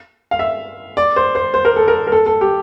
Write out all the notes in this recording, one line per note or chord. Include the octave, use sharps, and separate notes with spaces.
F5
E5
D5
C5
C5
C5
A#4
A4
A#4
A#4
A4
A4
G4